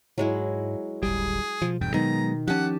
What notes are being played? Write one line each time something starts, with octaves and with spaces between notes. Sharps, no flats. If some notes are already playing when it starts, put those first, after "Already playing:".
G#2 F#3 G#3 E4
D1 G1 G3 G#4
B2 F3
F1 E2 G2 G5
D#3 F#3 G#3 B3 A#5
F3 C#4 G4 F#5 A5